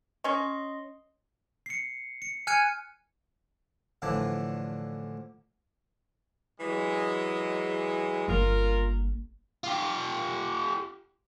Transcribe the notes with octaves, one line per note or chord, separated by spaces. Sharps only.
C#4 D#5 C6 C#6
C7 C#7
C#7
G#5 F6 F#6 G#6 C#7 D#7
A2 D3 E3 F3 D4
E3 F#3 G#3
G1 A#3 F4 A#4
F4 G4